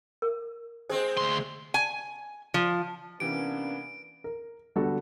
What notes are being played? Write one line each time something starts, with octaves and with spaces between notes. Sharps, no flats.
A#4
G#3 C4 G#4 C5
D2 C6
G#5
F3
C3 E3 A#3 B3 C#4 D4 G4 D7
A#4
D3 G3 B3 F#4 A4